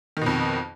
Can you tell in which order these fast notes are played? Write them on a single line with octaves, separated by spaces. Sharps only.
D#3 B2 F2